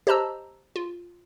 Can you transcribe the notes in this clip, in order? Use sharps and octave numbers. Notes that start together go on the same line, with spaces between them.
G4 C5 D#5 A5 A#5 E6
F4